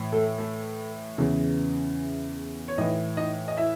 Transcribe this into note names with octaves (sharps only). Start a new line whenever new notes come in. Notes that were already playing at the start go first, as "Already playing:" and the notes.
Already playing: A2 E3
A3 A4
A3 A4
E2 C#3 E3
C#5
A2 E3 D#4 D#5
D#4 D#5
D#5
E4 E5